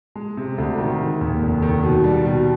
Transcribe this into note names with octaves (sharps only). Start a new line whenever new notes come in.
G#3
C3
D2
D#3
G#3
D#2
F1
D#3
B2
G3
B2